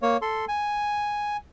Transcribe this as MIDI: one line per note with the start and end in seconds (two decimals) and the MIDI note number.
0.02 0.17 58
0.02 0.17 73
0.22 0.45 69
0.22 0.45 84
0.48 1.37 80